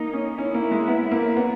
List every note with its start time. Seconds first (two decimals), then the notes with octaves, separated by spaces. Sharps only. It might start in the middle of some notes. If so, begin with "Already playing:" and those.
Already playing: A#3 D#4
0.13 C#4
0.38 C#4 E4
0.54 A#3
0.71 G#3
0.88 B3
1.11 A#3
1.36 B3